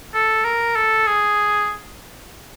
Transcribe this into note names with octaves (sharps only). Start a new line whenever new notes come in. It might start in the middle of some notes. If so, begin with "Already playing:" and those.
A4
A#4
A4
G#4